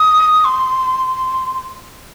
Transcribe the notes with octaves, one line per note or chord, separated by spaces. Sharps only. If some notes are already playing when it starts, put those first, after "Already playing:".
Already playing: D#6
C6